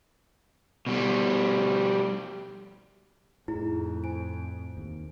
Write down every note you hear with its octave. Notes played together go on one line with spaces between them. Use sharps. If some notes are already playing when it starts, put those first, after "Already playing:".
B2 G3
F2 A2 D#4 E4 G#4 A#5
C5 G#5 D7
D#2